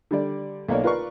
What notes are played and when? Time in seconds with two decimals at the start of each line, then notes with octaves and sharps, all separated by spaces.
0.11 D3 G3 D5
0.69 B1 A#3 C#5 D5
0.84 F4 A#4 B4 D5 F5 C#6